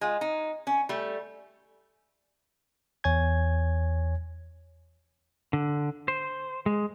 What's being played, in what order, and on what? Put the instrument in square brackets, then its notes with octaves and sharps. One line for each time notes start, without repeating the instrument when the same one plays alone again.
[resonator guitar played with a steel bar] G#3 F4
D#4
C#4
G3 A3
[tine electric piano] E2 C#5 G#5 G#6
[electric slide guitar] D3
C5
G#3